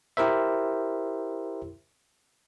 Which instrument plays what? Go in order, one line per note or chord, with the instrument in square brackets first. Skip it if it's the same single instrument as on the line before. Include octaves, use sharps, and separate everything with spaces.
[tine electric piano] E4 G4 A#4 C5 E5